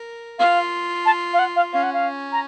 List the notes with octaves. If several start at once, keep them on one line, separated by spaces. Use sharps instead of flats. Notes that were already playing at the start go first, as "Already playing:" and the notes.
Already playing: A#4
F4 F5
A5
F5
F#5
F5
C#4 F5
F#5
F5
A#5